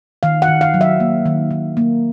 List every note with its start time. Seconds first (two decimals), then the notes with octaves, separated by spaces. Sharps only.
0.23 D#3 F5
0.42 F#5
0.48 D#3
0.61 F5
0.74 F#3
0.81 E5
1.00 A#3
1.26 D#3
1.51 D#3
1.77 A#3